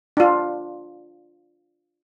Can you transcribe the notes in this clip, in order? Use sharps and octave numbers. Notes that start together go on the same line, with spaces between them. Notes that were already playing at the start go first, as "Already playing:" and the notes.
D4 F4